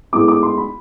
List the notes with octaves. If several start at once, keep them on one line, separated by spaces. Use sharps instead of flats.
A2 G#3 B3 E4 D6
D6
C6
B5